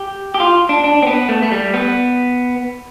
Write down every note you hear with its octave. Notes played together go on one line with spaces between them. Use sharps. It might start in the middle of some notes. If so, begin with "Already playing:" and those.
Already playing: G4
G4
F4
D4
D4
C4
B3
A3
A3
G3
B3